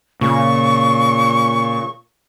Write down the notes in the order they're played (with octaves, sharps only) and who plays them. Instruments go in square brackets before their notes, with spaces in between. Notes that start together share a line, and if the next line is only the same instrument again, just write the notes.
[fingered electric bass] A#2 [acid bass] C#3 [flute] C#6